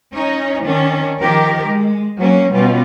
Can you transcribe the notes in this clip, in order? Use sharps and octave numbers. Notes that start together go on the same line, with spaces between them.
C#4 D#4 C#5
D#3 C#4 D4
D#3 F3 G4 A#4
G#3
F#3 A#3 C#4
B2 G3 C#4 F4